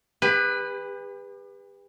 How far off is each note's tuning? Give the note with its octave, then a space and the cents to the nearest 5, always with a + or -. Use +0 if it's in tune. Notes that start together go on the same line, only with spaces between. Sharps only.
G4 +40 B4 +0